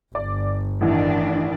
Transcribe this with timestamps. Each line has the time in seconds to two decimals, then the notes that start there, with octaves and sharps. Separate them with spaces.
0.15 G1 D5
0.81 A1 D#3 E3 D4